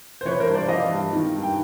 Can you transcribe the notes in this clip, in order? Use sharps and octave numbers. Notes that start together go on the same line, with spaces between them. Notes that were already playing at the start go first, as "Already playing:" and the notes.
C5
E3 B4 C#5
A#4 C5
G2
C5 D5
E3 D#5 F5
G2
D#3
G2
G5